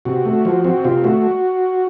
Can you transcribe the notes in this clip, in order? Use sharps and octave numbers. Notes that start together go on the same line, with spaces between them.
C3 F#4
A3
F3
C4 F#4
C3 F4
A3 F#4